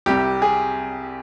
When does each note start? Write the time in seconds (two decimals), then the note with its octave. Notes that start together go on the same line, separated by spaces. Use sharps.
0.06 C2 C3 G3 G4
0.42 G#4